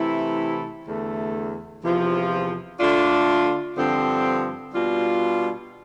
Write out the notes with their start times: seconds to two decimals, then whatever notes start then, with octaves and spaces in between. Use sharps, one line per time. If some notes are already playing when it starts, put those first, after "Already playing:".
Already playing: C3 E3 A3 E4
0.86 E2 D3 A3
1.83 E2 C3 F3
2.80 D3 A3 D4 F4
3.77 G2 D3 F3 C4
4.74 B2 G3 D4 F4